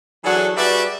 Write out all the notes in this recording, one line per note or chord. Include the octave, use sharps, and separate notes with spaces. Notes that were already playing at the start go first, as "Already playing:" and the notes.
E3 F#3 D4 F#4 G#4 A4
G3 F#4 G#4 B4 D5 E5